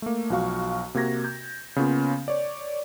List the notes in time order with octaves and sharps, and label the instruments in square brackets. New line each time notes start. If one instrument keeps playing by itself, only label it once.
[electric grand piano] A3 A#3
B1 F3 F#4 F5 C#6
C3 A#3 F#4 G#6 A#6
G6
C#3 A#3 B3 C#4 F4
C#5 D5